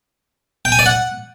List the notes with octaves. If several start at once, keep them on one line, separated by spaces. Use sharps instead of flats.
G5
G#5
D5
F#5